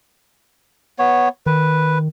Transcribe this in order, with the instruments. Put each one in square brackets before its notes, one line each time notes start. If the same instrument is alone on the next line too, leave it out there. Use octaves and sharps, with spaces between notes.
[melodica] B3 C#5
[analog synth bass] D#3 [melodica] B4